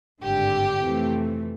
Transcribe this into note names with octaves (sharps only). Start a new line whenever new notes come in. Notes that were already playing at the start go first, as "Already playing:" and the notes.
G#1 G2 D3 G4
F2 C3 E3 A3